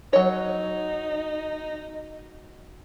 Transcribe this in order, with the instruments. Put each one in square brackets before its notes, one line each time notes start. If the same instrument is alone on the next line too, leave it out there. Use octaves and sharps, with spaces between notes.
[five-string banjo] F#3 C#5 [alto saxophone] D#4